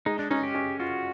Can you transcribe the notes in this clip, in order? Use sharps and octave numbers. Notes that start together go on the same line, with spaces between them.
G#3 D#4
D4
C#4 D#4
G4
C#4
F4 F#4